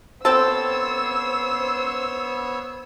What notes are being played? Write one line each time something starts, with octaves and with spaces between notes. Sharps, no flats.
B3 C4 A4 C5 C#5 E6